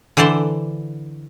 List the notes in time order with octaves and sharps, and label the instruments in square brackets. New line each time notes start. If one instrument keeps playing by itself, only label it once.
[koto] D3 E3 C5 D5 A5